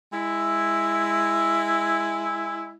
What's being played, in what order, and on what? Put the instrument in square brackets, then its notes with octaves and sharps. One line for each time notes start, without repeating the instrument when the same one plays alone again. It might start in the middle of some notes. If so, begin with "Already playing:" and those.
[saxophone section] G#3 E4